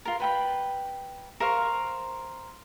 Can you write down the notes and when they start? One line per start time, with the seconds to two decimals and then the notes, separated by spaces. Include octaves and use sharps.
0.05 F4 A#4
0.20 B4 G5 B5
1.40 A#4 C5 F5 C#6